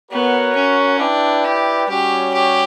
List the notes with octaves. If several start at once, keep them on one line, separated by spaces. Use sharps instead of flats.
B3 F#4 A#4 C#5 F#5
C#4
D4 E4 B4 D5 G5
G4
G3 C#4 F#4 G4 C#5
G4